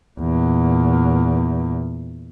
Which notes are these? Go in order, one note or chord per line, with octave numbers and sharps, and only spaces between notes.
E2 A#2